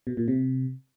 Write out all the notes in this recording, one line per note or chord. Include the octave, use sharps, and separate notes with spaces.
B2
A#2
C3